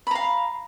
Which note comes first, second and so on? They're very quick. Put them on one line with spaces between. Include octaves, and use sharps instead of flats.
B5 A#5 F5